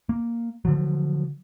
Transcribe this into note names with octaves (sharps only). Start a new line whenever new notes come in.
A#3
D3 F3 F#3